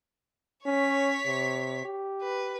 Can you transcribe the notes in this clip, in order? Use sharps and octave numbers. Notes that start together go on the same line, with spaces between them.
C#4 C#5 B6
C3
G4
B4